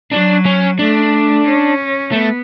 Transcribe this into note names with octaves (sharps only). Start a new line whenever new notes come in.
F#3 D4
C#4
A3 D4
C#4
A3 B3